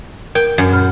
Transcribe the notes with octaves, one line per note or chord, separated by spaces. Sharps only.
A#4 G5
F#2
A#2 F6